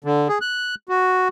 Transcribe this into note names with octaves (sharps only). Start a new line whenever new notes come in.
D3
G#4
F#6
F#4